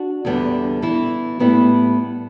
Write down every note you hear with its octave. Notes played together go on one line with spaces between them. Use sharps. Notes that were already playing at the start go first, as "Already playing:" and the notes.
Already playing: D4 F#4
E2 D3 G3 B3
E3 B3 E4
A2 G3 B3 E4 B4